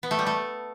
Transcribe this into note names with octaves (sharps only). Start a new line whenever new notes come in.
B3
A3
G3
A3